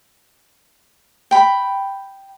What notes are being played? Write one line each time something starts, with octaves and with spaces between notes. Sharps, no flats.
G5 B5